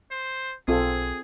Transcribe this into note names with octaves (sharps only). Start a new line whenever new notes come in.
C5
B1 C4 F4 G#4 A4